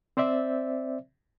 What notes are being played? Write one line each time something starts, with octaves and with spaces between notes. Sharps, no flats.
C4 C5 D5 E5